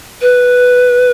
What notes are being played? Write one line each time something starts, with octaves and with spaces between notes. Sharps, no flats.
B4